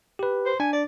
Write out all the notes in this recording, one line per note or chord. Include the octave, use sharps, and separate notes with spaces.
G4 B4
C5
D4 G#5
D5